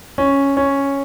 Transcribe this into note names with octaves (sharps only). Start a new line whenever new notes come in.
C#4
C#4